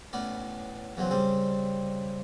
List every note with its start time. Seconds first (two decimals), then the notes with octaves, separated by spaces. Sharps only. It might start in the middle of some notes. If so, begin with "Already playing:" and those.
0.13 A2 B3 C#4 D5
0.97 E2 C#3 F#3 C4
1.11 C#3 G3 C4